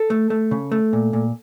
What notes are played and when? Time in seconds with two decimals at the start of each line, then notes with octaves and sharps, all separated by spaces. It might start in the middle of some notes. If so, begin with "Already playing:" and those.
Already playing: A4
0.10 A3
0.30 A3
0.51 C#3
0.72 A3
0.93 A#2
1.13 A#2